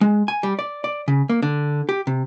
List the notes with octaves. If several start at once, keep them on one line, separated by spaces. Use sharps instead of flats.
G#3
G#5
G3
D5
D5
C#3
A#3
D3
G4
C3